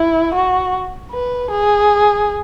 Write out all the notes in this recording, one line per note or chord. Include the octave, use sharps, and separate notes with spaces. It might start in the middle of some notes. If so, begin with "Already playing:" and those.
Already playing: E4
F#4
B4
G#4